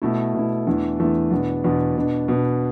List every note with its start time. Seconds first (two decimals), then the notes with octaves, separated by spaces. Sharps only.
0.02 B2 A3 E4
0.34 B2 A3 E4
0.67 E2 E3 A3 D4
0.99 E2 E3 A3 D4
1.31 E2 B2 B3 D4
1.64 E2 B2 B3 D4
1.96 B2 B3 D4
2.28 B2 B3 D4